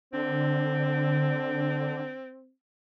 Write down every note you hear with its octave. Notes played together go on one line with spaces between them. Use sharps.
D3 C4